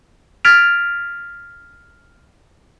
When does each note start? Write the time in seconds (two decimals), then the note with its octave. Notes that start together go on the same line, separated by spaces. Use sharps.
0.45 F6 G#6 A6 B6 D7 F7